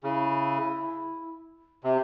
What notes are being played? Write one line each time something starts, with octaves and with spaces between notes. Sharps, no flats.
C#3 E4
C3 G4